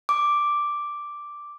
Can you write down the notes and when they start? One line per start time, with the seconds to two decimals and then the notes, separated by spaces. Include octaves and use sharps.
0.09 D6